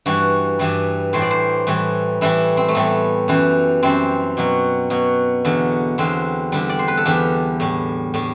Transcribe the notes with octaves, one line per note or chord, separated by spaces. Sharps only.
G2 E3 G3 F#4
G2 E3 G3
A2 E3 G3 C5
D5
C5
A2 E3 G3
A2 E3 G3 E4
C4
A3
A2 E3 G3 B3
F#2 E3 G3
F#2 E3 G3 C4
B2 F#3
B2 F#3
E2 D3 F#3
E2 D3 F#3 C4
E2 D3 G3
D5
C5
B4
A4
E2 D3 G3 G4
A2 G3
A2 G3